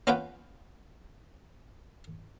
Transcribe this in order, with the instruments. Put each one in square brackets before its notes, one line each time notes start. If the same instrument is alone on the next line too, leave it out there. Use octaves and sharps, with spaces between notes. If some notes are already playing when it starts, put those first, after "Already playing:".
[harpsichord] B3 C#4 F4 B4 F#5 G5